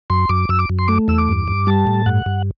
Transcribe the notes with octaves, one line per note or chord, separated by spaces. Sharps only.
F#2 C6
F#2 D6
F#2 E6
D6
F#2
C6
A3 D6
E2 E6
D6
G2
G2
G3 A5
A2
G2 F#5
G2